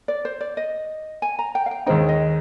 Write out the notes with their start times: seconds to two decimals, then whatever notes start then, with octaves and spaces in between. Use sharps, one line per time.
0.08 D5
0.25 C5
0.41 D5
0.57 D#5
1.22 G#5
1.39 A#5
1.55 G5
1.66 F5
1.71 G5
1.86 D#2 D#3 G#3 C4 D#4 G5
2.09 D#5